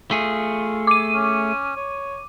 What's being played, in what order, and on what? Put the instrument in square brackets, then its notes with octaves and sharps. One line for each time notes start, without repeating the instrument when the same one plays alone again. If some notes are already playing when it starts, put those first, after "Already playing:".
[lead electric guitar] A3 G#4 [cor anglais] F4
[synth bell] D6 D#7
[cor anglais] C#4
C#5